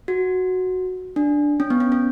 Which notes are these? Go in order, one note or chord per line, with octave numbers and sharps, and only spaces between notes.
F#4
D4
C#4
B3
C#4
C#4